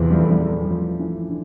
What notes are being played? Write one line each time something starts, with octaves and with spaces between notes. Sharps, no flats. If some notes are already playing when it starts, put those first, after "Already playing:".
Already playing: E2 C3 E3 F3
G3
A3
G3
A3
G3
F3
E3
D3